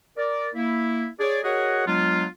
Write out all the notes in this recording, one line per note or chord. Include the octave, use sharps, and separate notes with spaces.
A#4 D5
A#3 E4
G#4 C#5 D5
F#4 G#4 A#4 C#5 D#5 F#5
F#3 G#3 B3 D4 F4